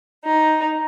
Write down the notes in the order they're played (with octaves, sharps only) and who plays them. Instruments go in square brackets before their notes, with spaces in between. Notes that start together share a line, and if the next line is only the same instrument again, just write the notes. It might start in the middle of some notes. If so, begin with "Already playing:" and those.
[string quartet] D#4